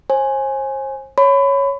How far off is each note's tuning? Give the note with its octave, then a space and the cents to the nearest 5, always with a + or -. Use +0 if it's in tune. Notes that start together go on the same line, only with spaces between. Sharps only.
C5 +40 G#5 +0
C#5 +0 B5 +30